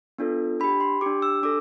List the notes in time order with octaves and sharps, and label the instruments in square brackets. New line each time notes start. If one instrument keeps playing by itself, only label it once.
[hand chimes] B3 D4 F4 A4
D4 G4 B5
C6
D4 G4 D6
E6
D4 A4 D6